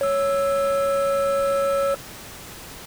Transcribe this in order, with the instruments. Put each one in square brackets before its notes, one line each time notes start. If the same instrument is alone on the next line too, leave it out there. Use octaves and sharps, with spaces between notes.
[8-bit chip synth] C#5 E6